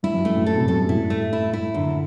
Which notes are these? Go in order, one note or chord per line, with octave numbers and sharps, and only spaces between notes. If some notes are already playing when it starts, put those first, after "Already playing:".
G2 E4
F#2
G2 A3
A2
A4
C3
F#2 A4
G2
A2 E4
A3
E4
E4
F#2 D3